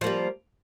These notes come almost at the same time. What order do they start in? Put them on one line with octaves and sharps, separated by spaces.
F3 A#3 G3